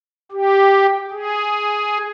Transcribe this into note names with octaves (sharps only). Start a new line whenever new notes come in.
G4
G#4